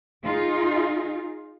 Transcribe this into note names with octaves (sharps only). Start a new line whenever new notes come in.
D#4 F4 G#4